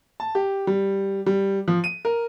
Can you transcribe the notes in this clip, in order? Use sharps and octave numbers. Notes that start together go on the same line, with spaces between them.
A5
G4
G3
G3
F3
D#7
A#4